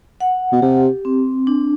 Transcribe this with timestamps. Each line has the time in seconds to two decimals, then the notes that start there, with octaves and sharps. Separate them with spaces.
0.20 F#5
0.52 B2
0.62 C3 G4
1.05 C4
1.47 D4